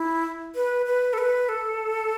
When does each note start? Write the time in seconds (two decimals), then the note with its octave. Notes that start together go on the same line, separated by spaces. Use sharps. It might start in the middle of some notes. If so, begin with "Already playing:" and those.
Already playing: E4
0.55 B4
0.86 B4
1.13 A4
1.18 B4
1.49 A4